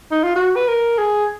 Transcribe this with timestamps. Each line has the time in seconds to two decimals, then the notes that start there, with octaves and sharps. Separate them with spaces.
0.11 D#4
0.24 F4
0.36 F#4
0.56 B4
0.67 A#4
0.98 G#4